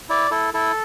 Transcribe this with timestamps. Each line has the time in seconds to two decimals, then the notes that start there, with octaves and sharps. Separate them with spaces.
0.09 E4 D5
0.31 E4 A4
0.54 E4 A4